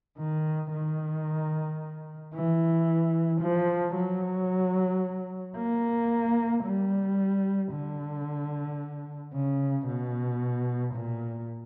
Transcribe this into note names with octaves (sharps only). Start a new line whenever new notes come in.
D#3
D#3
E3
F3
F#3
A#3
G3
D3
C#3
B2
A#2